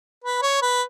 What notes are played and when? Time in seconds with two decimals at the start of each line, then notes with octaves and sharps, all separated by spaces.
0.24 B4
0.42 C#5
0.62 B4